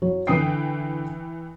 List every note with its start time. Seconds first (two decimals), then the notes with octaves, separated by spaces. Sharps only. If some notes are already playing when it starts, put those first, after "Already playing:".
0.02 F#3 C#5
0.27 D3 E3 G5 D#6 C7